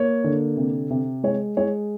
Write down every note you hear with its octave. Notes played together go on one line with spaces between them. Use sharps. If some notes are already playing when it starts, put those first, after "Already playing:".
Already playing: A#3 C#5
D3
C3
C3
G#3 C#5
G#3 C#5